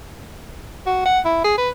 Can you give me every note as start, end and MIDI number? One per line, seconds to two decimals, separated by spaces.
0.86 1.02 66
1.05 1.19 78
1.25 1.44 64
1.44 1.54 68
1.58 1.70 71